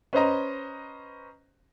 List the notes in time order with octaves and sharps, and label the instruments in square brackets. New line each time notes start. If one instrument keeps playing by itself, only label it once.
[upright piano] C#4 B4 C5 D#5 A#5